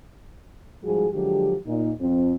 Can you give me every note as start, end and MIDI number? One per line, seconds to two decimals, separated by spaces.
0.84 1.07 44
0.84 1.07 53
0.84 1.07 55
0.84 1.07 66
0.84 1.07 68
1.13 1.56 50
1.13 1.56 53
1.13 1.56 54
1.13 1.56 56
1.13 1.56 67
1.67 1.91 46
1.67 1.91 63
2.00 2.35 41
2.00 2.35 60